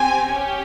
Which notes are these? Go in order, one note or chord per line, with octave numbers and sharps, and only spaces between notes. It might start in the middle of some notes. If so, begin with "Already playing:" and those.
Already playing: C4 G4 G#5
C#4 G4